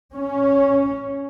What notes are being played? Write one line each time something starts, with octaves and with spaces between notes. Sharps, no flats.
C#4